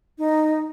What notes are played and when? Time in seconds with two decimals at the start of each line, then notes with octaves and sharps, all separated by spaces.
0.18 D#4